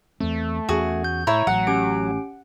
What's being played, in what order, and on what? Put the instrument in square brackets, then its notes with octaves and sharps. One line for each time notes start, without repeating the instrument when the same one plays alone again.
[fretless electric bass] E2 C4 [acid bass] A3
[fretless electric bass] E2 C4 C#4 [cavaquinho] F#4 G#4
[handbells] G6
[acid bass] A2 [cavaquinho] E4 C#5 [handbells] A#5
[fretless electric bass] A1 [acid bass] F#3 [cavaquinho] F#5
[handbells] C#4 G4 D7